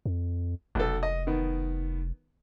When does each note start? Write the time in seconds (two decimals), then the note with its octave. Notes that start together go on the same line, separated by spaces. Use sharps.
0.06 F2
0.75 F1 B1 A4
1.03 D#5
1.27 D#3 B3